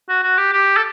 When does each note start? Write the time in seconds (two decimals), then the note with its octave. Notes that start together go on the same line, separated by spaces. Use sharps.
0.09 F#4
0.23 F#4
0.38 G4
0.52 G4
0.76 A4